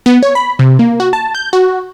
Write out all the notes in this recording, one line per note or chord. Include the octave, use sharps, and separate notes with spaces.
B3
C#5
B5
C3
A#3
F#4
A5
G6
F#4